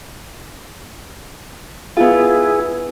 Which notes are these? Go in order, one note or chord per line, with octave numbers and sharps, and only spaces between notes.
B3 E4 F4 G#4